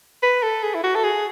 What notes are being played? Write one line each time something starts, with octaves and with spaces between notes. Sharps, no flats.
B4
A4
G#4
E4
F#4
A4
G#4